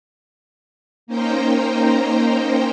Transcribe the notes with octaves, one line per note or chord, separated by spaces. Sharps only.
A#3 C#4 D#4 C5 G5 A#5